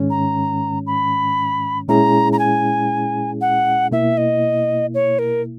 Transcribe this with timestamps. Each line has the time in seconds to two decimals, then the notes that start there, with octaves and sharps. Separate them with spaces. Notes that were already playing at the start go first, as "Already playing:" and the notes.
Already playing: G#2 D#3 G#3 C#4
0.10 A#5
0.87 B5
1.88 A#2 G#3 C#4 E4 G#4 A#5
2.33 A#5
2.39 G#5
3.41 F#5
3.91 B2 A#3 E4 E5
4.17 D#5
4.94 C#5
5.19 A#4